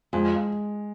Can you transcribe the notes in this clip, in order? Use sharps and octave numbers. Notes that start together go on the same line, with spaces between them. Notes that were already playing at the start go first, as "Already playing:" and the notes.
F2 G#3